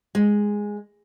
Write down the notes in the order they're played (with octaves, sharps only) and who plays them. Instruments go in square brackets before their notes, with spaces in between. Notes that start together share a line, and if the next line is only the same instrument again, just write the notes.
[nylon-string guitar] G#3